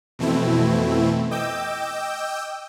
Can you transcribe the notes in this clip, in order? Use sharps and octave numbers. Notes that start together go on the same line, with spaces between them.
F2 B2 E3 A3 C4 E4
D#5 G5 D6 E6 G6